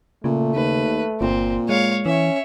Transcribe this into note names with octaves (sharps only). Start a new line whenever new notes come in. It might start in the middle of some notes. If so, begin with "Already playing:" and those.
A#2 C#3 A3
D#2 B4
G1 A#2 C4
G#3 C#5 F5
E3 C#4 C#5 E5